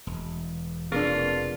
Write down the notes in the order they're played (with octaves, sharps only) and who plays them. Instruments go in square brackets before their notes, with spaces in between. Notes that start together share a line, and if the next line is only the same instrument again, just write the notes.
[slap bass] E1
[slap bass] F1 B2 [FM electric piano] A#3 D4 [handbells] C4 G#4 B4 [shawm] F4